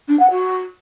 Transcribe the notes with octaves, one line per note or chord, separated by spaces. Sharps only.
D4
F#5
F#4